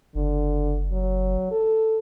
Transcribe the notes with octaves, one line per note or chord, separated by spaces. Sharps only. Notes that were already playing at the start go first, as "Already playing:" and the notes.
F#1 D3
F#3
A4